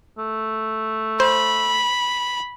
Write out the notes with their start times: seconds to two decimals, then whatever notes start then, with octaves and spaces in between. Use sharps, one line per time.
0.18 A3
1.20 C5 B5